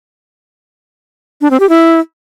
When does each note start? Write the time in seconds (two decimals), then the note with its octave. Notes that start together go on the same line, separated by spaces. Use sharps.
1.41 D4
1.51 C4
1.60 G4
1.69 E4